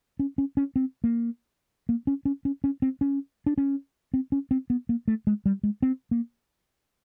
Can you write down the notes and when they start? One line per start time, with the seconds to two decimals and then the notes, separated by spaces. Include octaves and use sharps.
0.19 C#4
0.38 C#4
0.57 C#4
0.76 C4
1.04 A#3
1.89 A#3
2.07 C#4
2.25 C#4
2.45 C#4
2.64 C#4
2.82 C4
3.01 C#4
3.46 D4
3.58 C#4
4.14 C4
4.32 C#4
4.51 C4
4.70 B3
4.89 A#3
5.08 A3
5.27 G#3
5.46 G3
5.63 G#3
5.82 C4
6.11 A#3